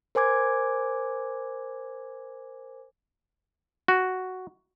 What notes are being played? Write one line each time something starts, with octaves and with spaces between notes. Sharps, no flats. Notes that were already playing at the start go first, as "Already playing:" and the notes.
A#4 C5 G#5 D6 G#6
F#4